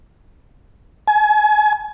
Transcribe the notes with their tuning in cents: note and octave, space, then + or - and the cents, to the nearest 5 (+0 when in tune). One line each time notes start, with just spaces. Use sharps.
G#5 +35